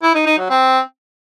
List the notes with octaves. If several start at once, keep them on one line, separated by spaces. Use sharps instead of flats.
E4
D#4
D#4
F#3
C4